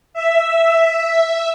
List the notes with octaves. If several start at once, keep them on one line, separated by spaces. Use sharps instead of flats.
E5